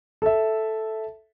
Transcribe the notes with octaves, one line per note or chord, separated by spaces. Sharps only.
A4 E5